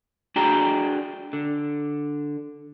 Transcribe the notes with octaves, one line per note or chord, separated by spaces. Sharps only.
D4 F#4 G#4 D5 G5 A#5
D3